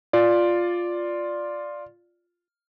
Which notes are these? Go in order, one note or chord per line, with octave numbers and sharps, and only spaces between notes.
F4 D5